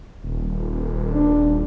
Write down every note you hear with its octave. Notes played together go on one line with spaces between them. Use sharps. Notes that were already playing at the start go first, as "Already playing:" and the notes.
D#1
D4